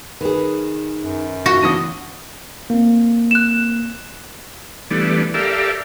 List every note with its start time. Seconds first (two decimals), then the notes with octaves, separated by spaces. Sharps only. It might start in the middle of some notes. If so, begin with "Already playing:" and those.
0.21 D#3 G#4 B4
1.02 F#2
1.46 F4 F#4 A#6
1.62 C#3 E3 B3 D4 D#6 A#6 D#7
2.70 A#3 C4
3.31 F#6 E7
4.91 E3 G3 A3 B3 D4
5.34 G4 A4 A#4 D5 E5 F5